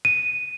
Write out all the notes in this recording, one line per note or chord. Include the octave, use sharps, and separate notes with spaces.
D#7